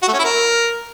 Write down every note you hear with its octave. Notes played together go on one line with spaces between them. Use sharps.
F#4
A3
C#4
E4
A#4